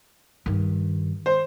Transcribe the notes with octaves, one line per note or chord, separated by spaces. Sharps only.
G2 D#3
C5